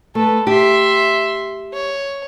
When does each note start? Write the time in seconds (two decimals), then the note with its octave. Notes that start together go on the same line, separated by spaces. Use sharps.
0.15 A3 A4 B4
0.47 G4 E5 C6
1.73 C#5